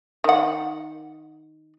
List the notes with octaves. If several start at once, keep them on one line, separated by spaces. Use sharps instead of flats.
D#3 F#5